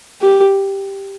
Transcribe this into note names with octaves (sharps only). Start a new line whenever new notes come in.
G4